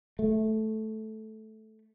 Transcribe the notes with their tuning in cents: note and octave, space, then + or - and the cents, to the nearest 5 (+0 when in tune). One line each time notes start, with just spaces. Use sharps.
A3 -10